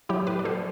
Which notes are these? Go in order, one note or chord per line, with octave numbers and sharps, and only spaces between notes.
F#3 E4 G4
A2 G4 B4
D5
F#3 A4 C5